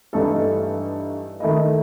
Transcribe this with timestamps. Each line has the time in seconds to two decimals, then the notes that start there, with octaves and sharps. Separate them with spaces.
0.13 G2 E3 A3 D#4 A4
1.40 D#3 A3 E4 A4 D#5